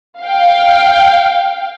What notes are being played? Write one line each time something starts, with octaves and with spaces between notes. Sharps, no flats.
F5 G5